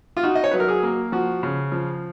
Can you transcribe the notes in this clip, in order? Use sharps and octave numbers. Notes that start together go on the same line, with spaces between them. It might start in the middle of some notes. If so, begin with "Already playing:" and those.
F4
D#4 F#4
D#5
C#5
F#3 B4
A#4
G#4
A#3
F3 F#4
C#3
F3